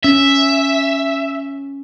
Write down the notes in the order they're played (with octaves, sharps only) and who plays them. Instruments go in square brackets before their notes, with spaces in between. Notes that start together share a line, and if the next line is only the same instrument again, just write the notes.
[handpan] C#4 [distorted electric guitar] E5